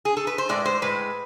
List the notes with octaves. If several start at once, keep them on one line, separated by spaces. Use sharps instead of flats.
G#4
A4
B4
C5
A2 G#3 D5
C5
A2 G#3 B4